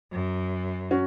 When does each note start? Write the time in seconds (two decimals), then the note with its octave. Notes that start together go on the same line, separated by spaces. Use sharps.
0.12 F#2
0.91 C#4 F#4